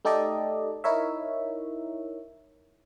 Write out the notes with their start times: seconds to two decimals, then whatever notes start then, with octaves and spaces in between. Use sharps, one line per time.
0.05 A3 D#4 G4 A4 D5 D#5
0.84 D#4 E4 A#4 C#5 E5